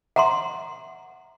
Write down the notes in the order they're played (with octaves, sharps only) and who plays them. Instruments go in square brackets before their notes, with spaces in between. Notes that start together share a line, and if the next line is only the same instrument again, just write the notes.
[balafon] E5 [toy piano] F#5 A#5 C6